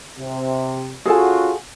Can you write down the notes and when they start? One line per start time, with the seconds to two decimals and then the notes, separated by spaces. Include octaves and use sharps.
0.19 C3
1.06 C#4 F4 F#4 G#4 A4 G#5